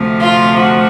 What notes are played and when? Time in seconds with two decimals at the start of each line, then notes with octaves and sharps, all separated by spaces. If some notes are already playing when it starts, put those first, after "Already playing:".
Already playing: D2 C3 F3
0.21 F4
0.59 F#4